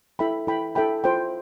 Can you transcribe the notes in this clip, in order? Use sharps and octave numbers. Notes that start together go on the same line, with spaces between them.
E4 A4 E5 G5 B5
E4 A4 E5 G5 B5
E4 A4 E5 G5 B5
F4 C5 G5 B5